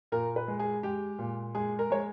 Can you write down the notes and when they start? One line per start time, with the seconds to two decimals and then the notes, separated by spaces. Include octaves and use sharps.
0.12 A#2 A#4
0.36 B4
0.48 G#3
0.59 G#4
0.83 G#3 G4
1.19 A#2
1.55 G#3 G#4
1.79 A#4
1.90 G#3 C#5